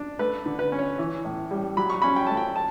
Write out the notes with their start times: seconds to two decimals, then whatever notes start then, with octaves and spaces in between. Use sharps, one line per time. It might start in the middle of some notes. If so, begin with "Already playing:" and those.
Already playing: D4
0.19 A3 B4
0.46 D3
0.59 B4
0.72 C#4
0.79 C#5
0.98 E3
1.24 A2
1.51 G3
1.77 F#3 B5
1.89 C#6
2.02 C#4 B5
2.16 G5
2.27 A3 A5
2.37 G5
2.56 A5